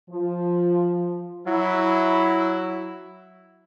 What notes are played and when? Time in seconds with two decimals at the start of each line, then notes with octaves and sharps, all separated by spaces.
0.11 F3
1.47 F#3 E4